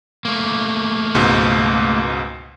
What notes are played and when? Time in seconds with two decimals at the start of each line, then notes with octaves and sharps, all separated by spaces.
0.25 A3 A#3
1.15 C#2 G#2 B2